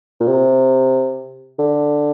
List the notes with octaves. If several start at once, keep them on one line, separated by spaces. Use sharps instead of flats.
A#2
C3
D3